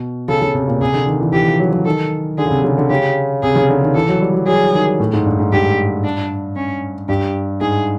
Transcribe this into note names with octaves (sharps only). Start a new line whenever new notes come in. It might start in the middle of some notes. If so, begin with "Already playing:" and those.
Already playing: B2
C#3 A4
C#3
C3
A#2
C3 G#4
D3
D#3
E3
E3 G4
F3
F#3
F#3
D#3 A4
D3 G#4
C#3
C3
C#3
D3
C#3 G4
C3 G#4
C#3
D3
D#3
E3 A4
F#3
G3
F#3
F#3 G#4
D#3
A2
G#2
G2
G#2
G2 G4
D4
C#4
G2 G4
G#2 G#4